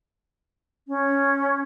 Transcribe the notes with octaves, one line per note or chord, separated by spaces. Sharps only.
C#4